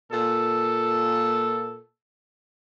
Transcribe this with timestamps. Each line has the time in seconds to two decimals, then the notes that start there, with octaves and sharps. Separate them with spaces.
0.12 A#2 A4